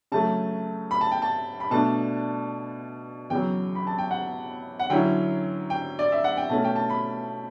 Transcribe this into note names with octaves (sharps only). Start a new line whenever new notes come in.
C#3 F#3 A3 A5
B5
A5
G5
A5
B5
B2 A3 D4 A5
E2 C#3 F#3 G5
B5
A5
G5
F#5
F#5
D3 F#3 C#4 E4 G5
G5
D5
E5
F#5
G5
B2 A3 C#4 A5
G5
A5
B5